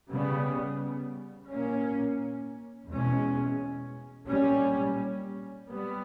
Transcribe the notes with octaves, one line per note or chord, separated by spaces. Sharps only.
C#3 G3 B3
A#2 A#3 C#4
E2 B2 G#3 C#4
A#2 G3 C#4
G3 B3